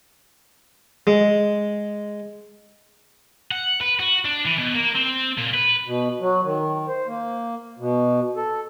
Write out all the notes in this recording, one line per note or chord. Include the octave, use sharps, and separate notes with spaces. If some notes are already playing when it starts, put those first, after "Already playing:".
G#3
F#5
B4
F#4
D4
E3
B2
A#3
C4
A#2
B4
B2
F#3
D#3
C5
A#3
B2
A4